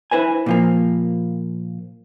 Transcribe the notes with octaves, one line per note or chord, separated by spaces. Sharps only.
E4 B4 C5 G#5
A#2 F3 A#3